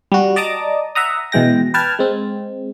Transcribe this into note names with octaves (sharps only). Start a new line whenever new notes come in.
G3 F#4
D5 D#5 A5 A#5 D6 D#6
E5 F#5 A#5 D#6
B2 E3 G#3 G5 A#6
B4 G5 A5 F6 G#6
G#3 C4